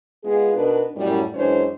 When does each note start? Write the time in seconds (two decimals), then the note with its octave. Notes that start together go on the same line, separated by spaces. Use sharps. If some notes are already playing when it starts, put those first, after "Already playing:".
0.23 G#3 B3 F4 G#4
0.54 B2 D4 D#4 A#4 B4
0.96 F#2 A2 G3
1.34 F#2 E3 G#3 D4 C5 C#5